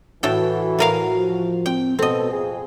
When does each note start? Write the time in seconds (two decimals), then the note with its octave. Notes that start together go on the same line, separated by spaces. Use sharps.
0.23 A2 E3 F#4 A4 G5
0.79 A2 A#4 F5
1.16 F3
1.66 C4 G5
1.99 B2 C4 A4 D#5
2.32 F2 G#4